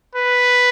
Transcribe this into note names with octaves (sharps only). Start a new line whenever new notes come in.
B4